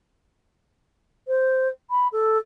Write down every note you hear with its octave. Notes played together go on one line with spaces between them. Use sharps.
C5
B5
A4